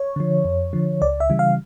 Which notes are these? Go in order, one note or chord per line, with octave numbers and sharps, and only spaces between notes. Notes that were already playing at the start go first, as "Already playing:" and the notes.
Already playing: C#5
D3 F3
F2
D3 F3
C#2 D5
E5
C#3 E3 G3
F5